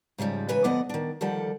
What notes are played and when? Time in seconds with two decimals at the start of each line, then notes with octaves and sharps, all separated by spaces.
0.18 G#2 C#3 F3 G3
0.49 G#2 C#3 E3 B4 G#5
0.64 D2 F3 B3 D5 D#5 F#5
0.89 D#3 D4
1.21 D2 D#3 F3 G3 A4 F#5